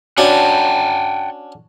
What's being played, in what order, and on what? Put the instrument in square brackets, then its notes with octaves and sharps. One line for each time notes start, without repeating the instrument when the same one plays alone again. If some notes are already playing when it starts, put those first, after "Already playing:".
[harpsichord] C#4 D4 F#4 [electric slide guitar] F#5 G5 A5